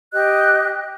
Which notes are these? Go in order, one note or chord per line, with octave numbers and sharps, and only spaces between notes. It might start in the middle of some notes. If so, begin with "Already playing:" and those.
G4 D#5 F#6